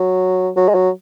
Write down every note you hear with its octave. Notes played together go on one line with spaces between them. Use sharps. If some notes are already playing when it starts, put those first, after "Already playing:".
Already playing: F#3
F#3
G#3
F#3